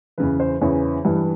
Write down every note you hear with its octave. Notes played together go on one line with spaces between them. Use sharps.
E2 C#3 E3 B4
C5
E2 C#3 E3 C#5
G2 E3